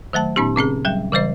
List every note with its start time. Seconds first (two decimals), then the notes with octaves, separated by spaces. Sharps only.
0.13 D#3 F#3 A3 A5
0.36 A#2 B3 C#4 D#4 G4
0.56 C#3 C4 C#4 G#4
0.85 F#3 G3 G5
1.12 C#3 E3 G3 C5 D#5